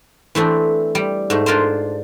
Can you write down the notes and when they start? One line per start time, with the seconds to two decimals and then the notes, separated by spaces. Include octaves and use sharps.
0.35 E3 A3 C4 D4
0.95 G3
1.30 G#2 A3
1.46 D4 F4 A#4 C5